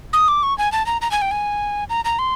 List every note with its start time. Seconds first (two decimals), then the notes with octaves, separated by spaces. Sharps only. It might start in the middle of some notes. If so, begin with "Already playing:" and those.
0.13 D#6
0.28 D6
0.43 C#6
0.58 G#5
0.72 A5
0.86 A#5
1.02 A#5
1.11 G#5
1.22 G5
1.31 G#5
1.90 A#5
2.05 A#5
2.19 C6